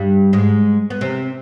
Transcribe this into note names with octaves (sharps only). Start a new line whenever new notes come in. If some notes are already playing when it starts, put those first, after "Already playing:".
Already playing: G2 G3
G#2 G#3
B3
C3 C4